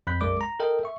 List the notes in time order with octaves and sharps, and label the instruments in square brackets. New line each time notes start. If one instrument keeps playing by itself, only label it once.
[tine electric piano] F2 B5 F#6 G6 B6
B1 F#2 G#3 A#4 D5 D6
A#5
A4 A#4 D#5 G5
E5 C#6